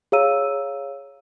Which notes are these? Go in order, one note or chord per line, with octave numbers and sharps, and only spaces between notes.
G#4 C#5 F5 A#5 E6 D#7